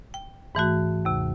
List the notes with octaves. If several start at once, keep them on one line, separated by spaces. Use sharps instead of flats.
G5
G#2 E3 A3 F#4
D#2 C3